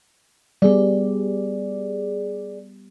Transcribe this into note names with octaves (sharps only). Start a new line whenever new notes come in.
G3 B3 G#4 D5